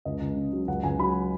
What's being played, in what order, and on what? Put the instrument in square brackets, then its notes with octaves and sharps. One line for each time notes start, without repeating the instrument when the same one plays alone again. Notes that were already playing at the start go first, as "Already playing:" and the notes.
[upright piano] C#2 D#5
C#2
C#3
F#3
C#2 F#5
C#2 G#5
F#3 B5